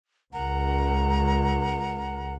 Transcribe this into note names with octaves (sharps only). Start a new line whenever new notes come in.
C#2 A#4 F#5 A#5